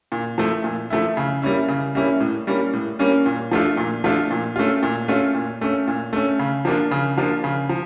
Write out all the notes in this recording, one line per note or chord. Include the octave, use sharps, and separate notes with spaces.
A#2
F3 A3 E4
A#2
F3 A3 E4
C#3
G3 A#3 C#4 E4
C#3
G3 A#3 C#4 E4
A2
G3 A#3 C#4
A2
G3 A#3 C#4
A#2
F3 A3 D4 F4
A#2
F3 A3 D4 F4
A#2
A3 C#4 F4
A#2
A3 C#4 F4
A#2
A3 C#4
A#2
A3 C#4
C#3
F3 A#3 D4 F4
C#3
F3 A#3 D4 F4
C#3
F3